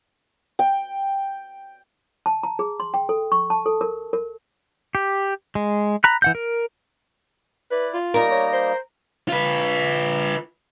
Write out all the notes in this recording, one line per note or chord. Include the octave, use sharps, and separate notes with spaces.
G5
A5
A#5
G#4
C6
G5
A4
C#6
A5
A4
A#4
A#4
G4
G#3
A#5 B5 F#6
E3 F#5 G6
A#4
E4 B4 D5
F4
G3 A#3 D#4 A#4 A#5
C#5
C5
F4 B4